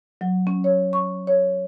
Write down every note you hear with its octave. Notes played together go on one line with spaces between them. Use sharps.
F#3
C#4
C#5
C#6
C#5